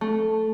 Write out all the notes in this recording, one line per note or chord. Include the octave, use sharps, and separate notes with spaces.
A3